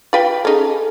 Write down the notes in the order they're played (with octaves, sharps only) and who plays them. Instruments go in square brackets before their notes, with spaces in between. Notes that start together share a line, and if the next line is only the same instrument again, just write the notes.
[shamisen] F4 B4 G5
[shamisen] C#4 D#4 [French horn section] G#4 A4